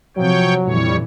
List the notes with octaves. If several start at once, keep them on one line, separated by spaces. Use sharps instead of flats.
C3 F3 F#3 C#5 G5
F2 A#2 D3 E3 G3 C#5